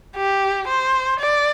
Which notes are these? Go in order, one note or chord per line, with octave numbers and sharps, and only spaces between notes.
G4
C5
D5